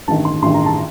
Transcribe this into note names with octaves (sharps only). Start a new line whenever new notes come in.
A1 G2 D#3 A5
C6
A1 G2 D#3 C6
A#5
A5